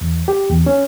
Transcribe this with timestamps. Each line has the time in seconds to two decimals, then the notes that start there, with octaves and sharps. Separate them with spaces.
0.01 E2
0.28 G4
0.50 E2
0.66 C#4